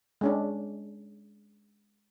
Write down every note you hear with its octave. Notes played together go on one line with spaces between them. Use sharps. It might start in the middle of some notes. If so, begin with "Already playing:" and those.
G#3 C#4 D4